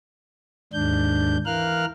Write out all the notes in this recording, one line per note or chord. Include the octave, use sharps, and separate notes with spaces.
D#2 G#2 D4 G6
E3 A#4 F5 F6 F#6